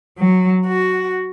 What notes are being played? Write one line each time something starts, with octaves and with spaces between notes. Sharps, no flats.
F#3
F#4